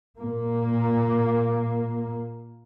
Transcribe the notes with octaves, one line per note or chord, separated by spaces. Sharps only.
A#2 A#3